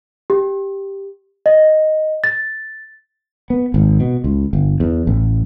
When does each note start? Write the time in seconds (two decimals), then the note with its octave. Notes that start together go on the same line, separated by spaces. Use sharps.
0.30 G4
1.46 D#5
2.24 A6
3.50 B3
3.74 G#1
4.00 B2
4.24 C#2
4.53 G1
4.80 E2
5.07 A1